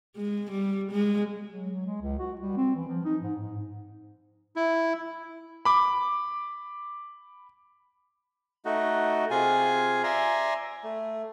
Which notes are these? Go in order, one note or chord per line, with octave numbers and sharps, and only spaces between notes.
G#3
G3
G#3
F#3
F#3
G#3
C#2
F#4
G3
C4
E3
F3
D#4
G#2
G#2
E4
B5 D6
A3 D#4 F#4
C3 F4 G#4 G#5
D5 E5 G#5 A#5 C6
A3